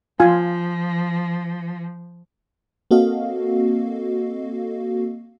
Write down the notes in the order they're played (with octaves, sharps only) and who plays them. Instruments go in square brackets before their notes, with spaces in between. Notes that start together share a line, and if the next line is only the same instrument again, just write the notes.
[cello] F3 [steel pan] F4 G#5
[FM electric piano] A#3 C4 F#4 A4 D#5 F5